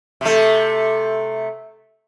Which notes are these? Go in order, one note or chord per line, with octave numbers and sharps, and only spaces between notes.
C3 A3